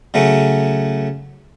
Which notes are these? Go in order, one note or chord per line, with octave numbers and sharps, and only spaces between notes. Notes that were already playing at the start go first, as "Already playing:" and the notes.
C#3 F#3 A3 C#4